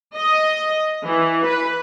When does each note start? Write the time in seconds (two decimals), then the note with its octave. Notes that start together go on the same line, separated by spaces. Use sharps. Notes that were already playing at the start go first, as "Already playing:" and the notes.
0.16 D#5
1.05 E3
1.47 B4